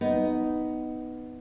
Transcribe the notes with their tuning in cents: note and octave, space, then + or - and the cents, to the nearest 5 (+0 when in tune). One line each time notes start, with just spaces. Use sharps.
B3 +10 D#4 +0